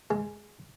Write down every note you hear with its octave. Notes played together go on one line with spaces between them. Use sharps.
G#3